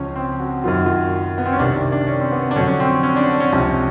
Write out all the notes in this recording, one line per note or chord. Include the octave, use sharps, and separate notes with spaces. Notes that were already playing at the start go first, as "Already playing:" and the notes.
Already playing: C#2 C#3 F3 C#4
C4
F#4
F#2 D#3 F#3 F4
F#4
F4
B3
C4
C#4
C2 C3 D#3 D4
D4
C#4
C4
B3
D4
F2 D3 F#3 C#4
C#4
C4
C#4
D4
C#4
C#2 C3 F3 C#4
C#4